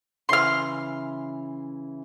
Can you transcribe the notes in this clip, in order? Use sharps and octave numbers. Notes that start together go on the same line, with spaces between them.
C#3 E3 C6 F6